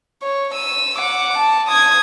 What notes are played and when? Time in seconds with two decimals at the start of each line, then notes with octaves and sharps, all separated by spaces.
0.23 C#5
0.54 E6 D#7
0.98 F#5 D6
1.38 A5
1.68 D#6 G#6